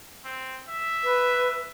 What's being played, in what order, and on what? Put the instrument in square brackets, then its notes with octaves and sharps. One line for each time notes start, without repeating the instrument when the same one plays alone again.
[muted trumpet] C4
E5
[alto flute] B4